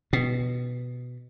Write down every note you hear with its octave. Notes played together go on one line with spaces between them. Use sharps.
B2